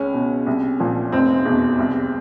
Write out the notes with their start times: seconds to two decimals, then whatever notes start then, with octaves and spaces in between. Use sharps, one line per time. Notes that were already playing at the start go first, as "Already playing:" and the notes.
Already playing: C#2 C#4
0.14 B2
0.47 C2
0.80 A#2 F3
1.12 F1 C4
1.45 E2 B2
1.78 C2